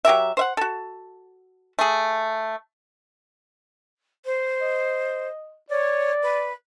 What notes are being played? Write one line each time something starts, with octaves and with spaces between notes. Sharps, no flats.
F#3 G4 A#4 E5
C5 E5 F#5
F#4 A4
A3 G#4
C5
D#5
C#5 D5
B4